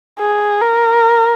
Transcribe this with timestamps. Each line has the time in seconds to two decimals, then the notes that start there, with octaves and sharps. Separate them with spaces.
0.20 G#4
0.61 A#4